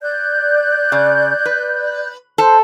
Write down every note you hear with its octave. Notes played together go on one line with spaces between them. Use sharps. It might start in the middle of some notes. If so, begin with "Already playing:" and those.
D5 F#6 G6
C#3
B4
A4 C5